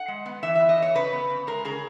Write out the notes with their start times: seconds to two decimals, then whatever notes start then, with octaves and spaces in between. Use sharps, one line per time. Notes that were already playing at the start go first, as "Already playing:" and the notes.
Already playing: F#5
0.08 G#3
0.26 B3
0.43 E3 E5
0.55 B3 E5
0.69 D#5
0.78 E3 C#5
0.95 C#3 B4
1.13 B3
1.30 C#3
1.47 G#3 A#4
1.65 C#3 G#4